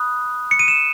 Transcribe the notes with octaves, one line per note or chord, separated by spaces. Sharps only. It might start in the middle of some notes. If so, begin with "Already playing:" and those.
Already playing: B5 D#6 F#6
C#7
D#7
E7